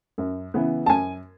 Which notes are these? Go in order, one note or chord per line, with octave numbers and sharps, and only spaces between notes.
F#2
C#3 E3 B3
A5
F#2 G#5